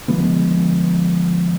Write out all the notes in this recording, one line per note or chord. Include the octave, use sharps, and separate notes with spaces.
D3 F3 G#3 B3